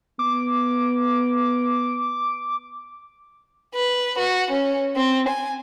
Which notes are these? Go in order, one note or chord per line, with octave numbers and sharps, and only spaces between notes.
B3 D6
B4
F#4
C#4
C4
G#5